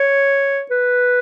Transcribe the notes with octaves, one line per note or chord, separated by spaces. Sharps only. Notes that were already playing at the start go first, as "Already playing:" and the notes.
Already playing: C#5
B4